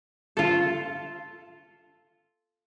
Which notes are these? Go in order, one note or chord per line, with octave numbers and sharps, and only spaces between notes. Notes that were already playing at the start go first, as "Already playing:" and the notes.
F4 A4